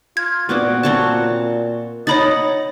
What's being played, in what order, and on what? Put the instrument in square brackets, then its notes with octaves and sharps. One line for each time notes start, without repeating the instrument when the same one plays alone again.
[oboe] F4 [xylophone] G#6
[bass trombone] A#2 [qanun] B3 C4 D5 [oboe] F#4
[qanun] C4 C#5 A5
[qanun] D#4 F#5 A#5 [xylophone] C#5 B5 A6 [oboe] D#5